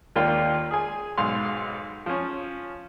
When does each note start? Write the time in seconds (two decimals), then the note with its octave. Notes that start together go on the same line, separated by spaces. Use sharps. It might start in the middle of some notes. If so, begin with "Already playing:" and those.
0.16 D#2 A#3 D4 F4 G5 C6
0.71 G#4 G#5
1.18 B1 G#2 F5 C6
2.06 F3 C#4